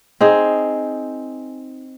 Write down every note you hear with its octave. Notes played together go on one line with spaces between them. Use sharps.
C4 D#4 G#4